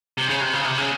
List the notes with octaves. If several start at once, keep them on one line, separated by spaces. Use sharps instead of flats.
C3
C#3
C3
C#3
C3
C#3